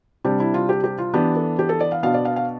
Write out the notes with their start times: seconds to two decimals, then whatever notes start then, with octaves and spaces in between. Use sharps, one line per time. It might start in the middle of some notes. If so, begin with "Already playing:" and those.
0.24 C3 G3 D4 G4
0.40 E4
0.54 F4
0.69 G4
0.84 G4
0.98 F4
1.14 E3 B3 D4 G4
1.36 A4
1.59 G4
1.69 A4
1.80 D5
1.92 F5
2.03 B2 B3 D4 F5
2.14 D5
2.25 F5
2.36 F5